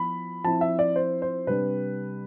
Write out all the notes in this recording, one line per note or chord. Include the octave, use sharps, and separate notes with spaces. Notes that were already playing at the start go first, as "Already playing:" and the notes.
Already playing: F3 B3 E4 B5
F3 C4 E4 A5
E5
D5
C5
C5
C3 G3 D4 B4